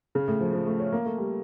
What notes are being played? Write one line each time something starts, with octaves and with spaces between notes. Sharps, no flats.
C#3
A2
F3
F3
A3
C#4
A#3
A3
G3